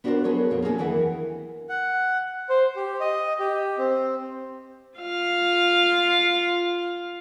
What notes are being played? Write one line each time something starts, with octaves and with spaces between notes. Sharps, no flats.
B3 D4 F#4 A4 A#4 C5
B3 G#4 A4 C#5
F2 B2 A#3
A#3 C4 D4 F4 G#4 A4
D#2 E3 G#4 B4 F#5
F#5
C5
G4
D#5
G4
C4
F4 F5